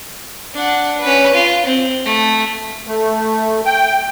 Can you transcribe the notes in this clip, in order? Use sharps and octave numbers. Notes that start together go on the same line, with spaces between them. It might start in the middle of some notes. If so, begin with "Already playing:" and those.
D4 F#5
C#4 B4
F4
C4
A3
A3
G5